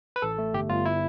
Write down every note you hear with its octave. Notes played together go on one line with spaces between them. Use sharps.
B4
A1 A4
A3
G1 G4
G1 F4
E4